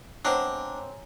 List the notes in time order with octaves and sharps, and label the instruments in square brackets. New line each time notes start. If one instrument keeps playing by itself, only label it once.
[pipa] G#3 B3 C4 [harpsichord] D4 [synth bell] C#5 G#5 A#5